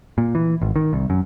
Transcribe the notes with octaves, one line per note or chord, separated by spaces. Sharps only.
A#2
E3
G#1
D#3
C2
F#2